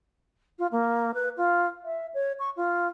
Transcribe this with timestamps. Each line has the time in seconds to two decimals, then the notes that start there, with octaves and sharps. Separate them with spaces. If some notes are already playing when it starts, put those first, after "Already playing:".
0.59 F4
0.72 A#3
1.14 B4
1.37 F4
1.84 E5
2.14 C#5
2.39 C#6
2.56 F4